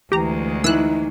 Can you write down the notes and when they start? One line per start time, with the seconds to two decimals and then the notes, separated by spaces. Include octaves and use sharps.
0.12 D2 E3 G#3 G4 A#5
0.64 E3 D#4 E6 F#6